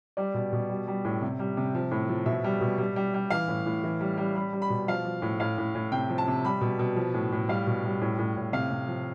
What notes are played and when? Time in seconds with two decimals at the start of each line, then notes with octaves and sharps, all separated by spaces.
0.17 G3 D5
0.34 B2
0.53 B2
0.70 G3
0.88 G3
1.04 A2
1.22 C3
1.39 G3
1.57 C3
1.75 F3
1.91 A2
2.09 F3
2.26 B2 E5
2.44 G3
2.61 B2
2.78 G3
2.96 G3
3.14 G3
3.30 E3 F5
3.48 A2
3.66 A2
3.84 E3
4.01 G3
4.17 G3
4.35 G3 B5
4.53 G3
4.62 B5
4.70 B2
4.88 F3 F5
5.05 F3
5.22 A2
5.40 A2 F5
5.58 A2
5.75 A2
5.92 C3 G5
6.10 F3
6.18 A5
6.28 C3
6.45 G3 B5
6.61 B2
6.79 B2
6.96 F3
7.14 A2
7.32 A2
7.49 G3 F5
7.67 B2
7.84 G3
8.01 A2
8.18 A2
8.36 A2
8.53 C3 F5
8.70 C3
8.88 F3